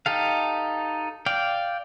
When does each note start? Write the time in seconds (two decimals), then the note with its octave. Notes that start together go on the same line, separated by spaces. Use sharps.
0.06 D#4 G4 A4 F5
1.26 D5 F5 G5